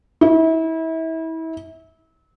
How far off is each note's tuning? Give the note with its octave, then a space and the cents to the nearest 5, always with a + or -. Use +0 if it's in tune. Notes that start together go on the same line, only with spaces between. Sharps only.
E4 -30